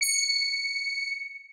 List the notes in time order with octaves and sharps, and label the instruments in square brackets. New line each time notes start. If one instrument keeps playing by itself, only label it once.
[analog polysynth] C#7